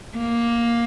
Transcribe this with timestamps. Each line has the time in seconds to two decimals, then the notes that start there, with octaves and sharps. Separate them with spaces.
0.17 A#3